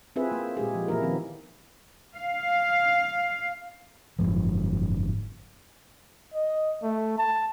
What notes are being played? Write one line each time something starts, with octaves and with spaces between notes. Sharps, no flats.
C4 E4 F4 G#4 B4 E5
A#3
A#2 G#3 G4 G#4
F3
A#2 E3 A#3 E4 A#4
D#3 F3 B3 C4
F5
F#1 C2 G#2 F3
D#5
A3
A5